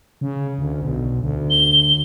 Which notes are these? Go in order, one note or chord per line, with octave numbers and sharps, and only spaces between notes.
C#3
D2
B1
D2
G7